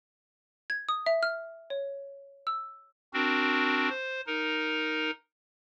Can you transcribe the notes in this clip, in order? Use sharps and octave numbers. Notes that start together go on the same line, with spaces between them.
G#6
D#6
E5
F6
C#5
E6
C4 D4 F#4 A#4
C5
D#4 A#4